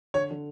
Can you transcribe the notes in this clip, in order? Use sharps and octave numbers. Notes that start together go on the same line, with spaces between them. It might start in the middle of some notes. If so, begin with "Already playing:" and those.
D3 C#5
D3